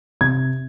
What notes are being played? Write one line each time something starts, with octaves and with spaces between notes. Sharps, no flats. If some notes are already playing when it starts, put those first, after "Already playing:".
C3 G#6